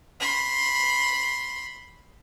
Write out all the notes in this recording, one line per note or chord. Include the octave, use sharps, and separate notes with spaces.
B5 C6